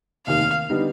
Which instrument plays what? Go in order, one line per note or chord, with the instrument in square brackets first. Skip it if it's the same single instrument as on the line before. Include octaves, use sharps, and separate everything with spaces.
[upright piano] F1 D#2 D#3 [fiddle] F5
[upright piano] D3 G3 B3 D#4